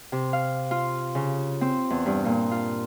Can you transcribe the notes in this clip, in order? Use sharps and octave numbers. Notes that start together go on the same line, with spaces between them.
C3
F5
F4
C#3
C4
E2
G2
A#2
F4